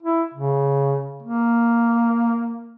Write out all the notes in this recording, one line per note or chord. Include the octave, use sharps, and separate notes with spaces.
E4
C#3
A#3